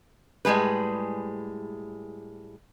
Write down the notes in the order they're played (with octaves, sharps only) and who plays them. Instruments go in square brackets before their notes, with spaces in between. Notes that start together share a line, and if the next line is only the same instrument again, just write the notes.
[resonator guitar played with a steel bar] A2 G3 G#3 G#4 B4